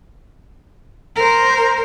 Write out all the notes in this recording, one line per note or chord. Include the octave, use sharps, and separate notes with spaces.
A#4 C5